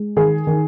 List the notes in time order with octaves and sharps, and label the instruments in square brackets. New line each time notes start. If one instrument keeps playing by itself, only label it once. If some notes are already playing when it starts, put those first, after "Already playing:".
Already playing: [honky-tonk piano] G#3
D#3 G#4
D#3